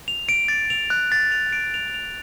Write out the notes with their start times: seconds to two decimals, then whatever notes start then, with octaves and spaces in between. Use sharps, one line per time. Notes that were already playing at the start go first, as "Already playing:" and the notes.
0.08 F7
0.29 D7
0.48 A6
0.70 F7
0.90 F#6
1.12 A6
1.32 F7
1.52 D7
1.74 F7
1.94 F7